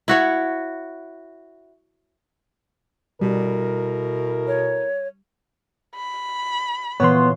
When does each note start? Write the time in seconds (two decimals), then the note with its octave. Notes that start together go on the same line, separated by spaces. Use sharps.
0.08 E4 F#4 C#5
3.21 B2 G3 E4 A4 A#4
4.47 C#5
5.96 B5
7.00 A#2 E3 B3 C#5 C6